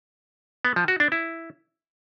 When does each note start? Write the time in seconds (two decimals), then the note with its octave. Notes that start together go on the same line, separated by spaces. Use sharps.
0.65 B3
0.76 F3
0.88 F#4
1.00 D4
1.12 E4